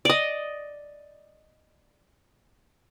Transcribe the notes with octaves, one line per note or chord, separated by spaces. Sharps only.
D5 D#5